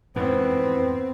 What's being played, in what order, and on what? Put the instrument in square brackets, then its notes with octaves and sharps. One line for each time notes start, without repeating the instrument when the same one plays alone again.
[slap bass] F2 G#2 E3 [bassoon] B3 [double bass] C4